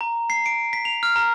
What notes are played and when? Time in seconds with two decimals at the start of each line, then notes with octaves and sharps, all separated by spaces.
0.01 A#5
0.30 C7
0.46 D7
0.73 B6
0.85 F7
1.03 F6
1.16 A#5